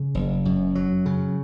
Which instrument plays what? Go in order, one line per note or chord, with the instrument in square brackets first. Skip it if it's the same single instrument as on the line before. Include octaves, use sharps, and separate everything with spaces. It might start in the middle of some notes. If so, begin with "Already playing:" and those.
Already playing: [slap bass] C#3
F#1
F#2
F#3
C#3